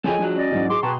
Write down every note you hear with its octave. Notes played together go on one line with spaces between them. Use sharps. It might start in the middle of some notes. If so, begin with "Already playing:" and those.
F3 G#4 A4 C#5 D#5 G5 G#5
G3 D4 F#4
C#4 D5 D#5
G#2 E3 F#3
F#4 G#4 C6 D6
B2 G#4 B4 G5 A5 A#5 C#6